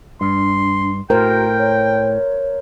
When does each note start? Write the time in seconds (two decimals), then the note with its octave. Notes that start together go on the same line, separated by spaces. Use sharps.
0.21 G2 D4 C6
1.10 A2 F#4 A#4 C5 G5
1.59 C#5